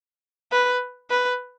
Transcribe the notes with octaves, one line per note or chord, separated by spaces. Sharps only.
B4
B4